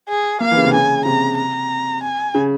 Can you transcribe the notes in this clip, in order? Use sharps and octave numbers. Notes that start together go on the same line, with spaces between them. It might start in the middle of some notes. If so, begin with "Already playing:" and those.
G#4
A#3 F5
E3
C#3
C3
C#3 G#5
C3 A#5
A#5
G#5
C#3